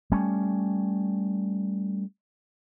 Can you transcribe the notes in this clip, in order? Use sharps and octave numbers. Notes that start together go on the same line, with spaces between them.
G3 A3 C#4